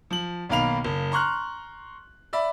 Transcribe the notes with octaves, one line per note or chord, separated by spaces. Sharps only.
F3 F#7
B1 D#3 A#3 F5 B5 F7
F#1
A#5 C6 C#6 F6 F#6
D5 E5 B5